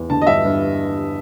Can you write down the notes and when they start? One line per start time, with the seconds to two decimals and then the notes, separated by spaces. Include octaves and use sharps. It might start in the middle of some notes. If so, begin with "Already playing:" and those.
Already playing: E2
0.10 D3 A5
0.22 D#5
0.27 G2 E5
0.45 G2